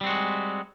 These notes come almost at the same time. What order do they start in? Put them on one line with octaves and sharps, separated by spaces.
G3 C4 F#4 G#3